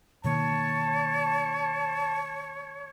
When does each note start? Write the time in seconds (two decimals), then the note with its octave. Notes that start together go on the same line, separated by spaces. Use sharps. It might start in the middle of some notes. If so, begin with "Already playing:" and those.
0.24 B2 D#3 A#3 C#5 A5